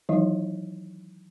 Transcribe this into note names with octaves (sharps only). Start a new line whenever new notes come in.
D#3 E3 F#3 G#3 D#4 E4